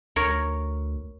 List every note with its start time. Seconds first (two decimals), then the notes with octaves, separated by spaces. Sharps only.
0.16 D2 A#4 C#5